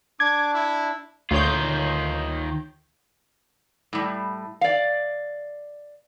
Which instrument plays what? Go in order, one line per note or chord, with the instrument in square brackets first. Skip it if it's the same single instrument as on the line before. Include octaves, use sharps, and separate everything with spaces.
[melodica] D4 [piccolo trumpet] D6 [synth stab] G#6
[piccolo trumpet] E4
[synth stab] D2 C#5 G6 [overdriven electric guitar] D#3 F4
[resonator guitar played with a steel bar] A2 G3
D5 F5